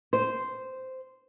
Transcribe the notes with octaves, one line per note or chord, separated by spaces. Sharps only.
C5